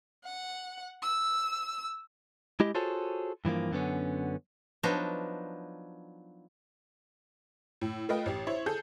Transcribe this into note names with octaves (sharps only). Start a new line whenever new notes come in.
F#5
E6
G#3 E4 G4 D#5
F4 F#4 G#4 A4 C5 C#5
G2 E3 F3 A#3
F#2 D3 B3 C#4
F3 F#3 B3 D4 D#4
A2
A3 F4 B4 D#5 G5
A1 G4
E4 C5 C#5
G#4 A4 G6